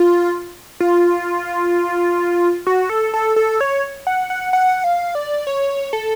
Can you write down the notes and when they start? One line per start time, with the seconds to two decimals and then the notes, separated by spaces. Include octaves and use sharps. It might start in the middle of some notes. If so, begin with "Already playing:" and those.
Already playing: F4
0.80 F4
2.67 F#4
2.90 A4
3.14 A4
3.36 A4
3.61 C#5
4.07 F#5
4.30 F#5
4.53 F#5
4.84 F5
5.15 D5
5.47 C#5
5.93 A4